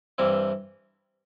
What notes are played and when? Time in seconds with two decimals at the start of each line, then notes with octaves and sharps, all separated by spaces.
0.18 G2 E3 G3 C4 E4